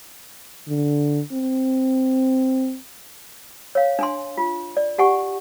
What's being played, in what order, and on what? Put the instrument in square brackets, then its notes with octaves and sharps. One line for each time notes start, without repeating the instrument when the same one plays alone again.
[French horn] D3
C4
[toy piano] C#5 F5
D4 G#5 C6
F4
D5
G4 F#5 G#5 C#6